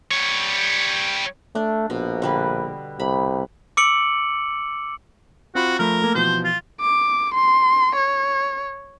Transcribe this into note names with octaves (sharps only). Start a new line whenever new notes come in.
G3 C#5
A3 D4
A#1 B2
D3 G3 B4
C2 B5
D6 E6 C#7 D7 F#7
C4 F4 F#4 B5
F3 A3 A#4 B5
A3 A#3
B2 E3 F3 C5
F4
D6
C6
C#5